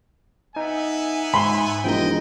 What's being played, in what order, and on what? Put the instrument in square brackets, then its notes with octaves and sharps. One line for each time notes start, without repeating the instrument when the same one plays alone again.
[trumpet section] B3 E5 G#5 [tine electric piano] D#4
[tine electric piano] G#2 [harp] B5 C6
[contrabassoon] E1 [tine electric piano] F3 A#3 D#4 [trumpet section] D#5 G5